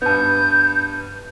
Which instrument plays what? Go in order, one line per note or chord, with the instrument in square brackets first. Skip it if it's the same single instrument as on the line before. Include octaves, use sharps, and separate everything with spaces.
[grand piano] G2 B3 [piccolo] G6